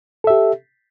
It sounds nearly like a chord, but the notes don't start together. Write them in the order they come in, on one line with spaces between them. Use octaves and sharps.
A4 E5 G4